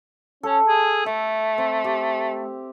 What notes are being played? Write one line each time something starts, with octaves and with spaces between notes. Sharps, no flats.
C#4 A4
G#4
A3 E5
C4
G4